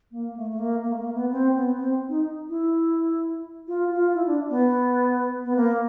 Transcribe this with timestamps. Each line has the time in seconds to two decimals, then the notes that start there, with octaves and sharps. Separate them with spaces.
0.12 A#3
0.36 A3
0.51 A3
0.59 A#3
0.83 A#3
0.92 A3
0.99 A#3
1.15 B3
1.31 C4
1.55 B3
1.78 C4
2.09 D#4
2.49 E4
3.68 F4
3.90 F4
4.14 E4
4.27 D4
4.50 B3
5.45 B3
5.56 A#3